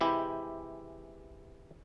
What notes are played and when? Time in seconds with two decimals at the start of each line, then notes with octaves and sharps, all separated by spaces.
0.01 C3 E3 G#3 E4 G4